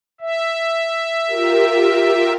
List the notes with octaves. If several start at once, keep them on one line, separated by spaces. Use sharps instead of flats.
E5
F4 G4 A#4